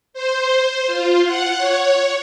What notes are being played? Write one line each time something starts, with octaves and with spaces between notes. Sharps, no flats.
C5
F4
F#5
C#5